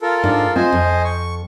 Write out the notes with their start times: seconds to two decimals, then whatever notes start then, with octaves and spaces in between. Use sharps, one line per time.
0.01 F4 A4 A#4
0.23 G#2 D4 D#4
0.56 C4 F4 C5 D#5 G#5
0.73 F2
1.04 C#6